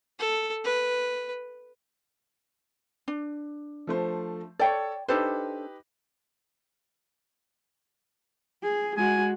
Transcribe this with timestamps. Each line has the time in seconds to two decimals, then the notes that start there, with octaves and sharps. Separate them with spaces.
0.19 A4
0.64 B4
3.08 D4
3.87 F3 A3 C5
4.59 A4 C#5 D5 G5
5.08 D4 D#4 G4 A4 B4 C5
8.63 G#4
8.97 G#3 F#4 G#5